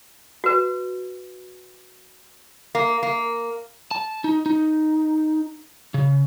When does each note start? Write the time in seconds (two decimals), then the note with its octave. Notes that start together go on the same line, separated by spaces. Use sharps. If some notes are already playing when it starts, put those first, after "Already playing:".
0.44 F#4 B4
2.75 A#3
3.03 A#3
3.91 A5
4.24 D#4
4.46 D#4
5.94 C#3